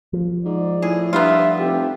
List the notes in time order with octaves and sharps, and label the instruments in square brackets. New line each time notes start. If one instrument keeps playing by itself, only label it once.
[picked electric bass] F3
[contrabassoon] G#2 [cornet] D5
[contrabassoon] A2 [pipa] G#4
[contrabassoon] G2 [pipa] B3 D#4 F4 [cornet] E5
[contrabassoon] F1 [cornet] G4